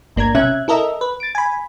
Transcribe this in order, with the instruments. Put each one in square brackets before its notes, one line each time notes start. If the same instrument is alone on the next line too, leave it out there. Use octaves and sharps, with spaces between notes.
[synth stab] G1 A#3 D4 A#5 G#6
B1 C3 C#4 E5 F#6 G#6
E4 A4 A#4 D#5 E5
B4
A6 D7
G#5 B5